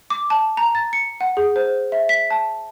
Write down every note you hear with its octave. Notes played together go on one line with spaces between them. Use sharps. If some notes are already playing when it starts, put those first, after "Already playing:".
D6
A5
A#5
A6
C#7
F#5
G#4
C5
E5
B6
A5